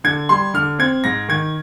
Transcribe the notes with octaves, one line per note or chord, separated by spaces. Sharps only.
D3 G#6
G3 C6
D3 F6
C4 G#6
G#2 A#6
D#3 G#6